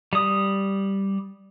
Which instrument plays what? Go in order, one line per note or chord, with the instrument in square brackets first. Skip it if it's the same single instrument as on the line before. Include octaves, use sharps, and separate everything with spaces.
[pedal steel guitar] G3 D#6